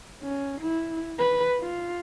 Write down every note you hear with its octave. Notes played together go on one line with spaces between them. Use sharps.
C#4
E4
B4
F4